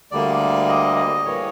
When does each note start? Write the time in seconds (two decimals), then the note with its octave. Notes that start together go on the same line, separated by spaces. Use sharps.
0.11 D2 D3 G3 A#3 D5
0.68 D#5
0.96 D#5
1.25 A2 E3 G3 A#3 C#5